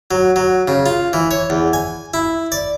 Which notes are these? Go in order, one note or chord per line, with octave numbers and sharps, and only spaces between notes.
F#3
F#3
C#3
F4
E3
C#5
E2
G#5
E4
D5